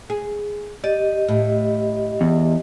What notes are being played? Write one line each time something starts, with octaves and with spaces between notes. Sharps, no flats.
G#4
G4 D5 D#5
A2
E2